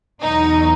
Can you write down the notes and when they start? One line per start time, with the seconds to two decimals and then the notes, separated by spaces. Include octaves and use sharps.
0.23 E2 B2 F#3 D#4